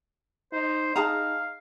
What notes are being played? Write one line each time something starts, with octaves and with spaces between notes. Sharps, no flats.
D#4 C5
D#4 G#4 F5 A5 A#5